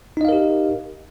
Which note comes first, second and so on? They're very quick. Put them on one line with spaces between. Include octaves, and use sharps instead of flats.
D#4 D#5 F5 A#4 G4